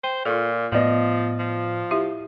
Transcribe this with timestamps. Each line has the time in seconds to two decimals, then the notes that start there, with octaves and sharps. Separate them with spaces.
0.04 C5 G5
0.25 A#2 F4 A4
0.72 A2 F3 B3 D5 D#5
1.39 F3
1.91 E4 G4 E5